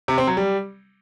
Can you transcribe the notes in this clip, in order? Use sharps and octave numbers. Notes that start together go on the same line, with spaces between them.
C3
C4
F#3
G3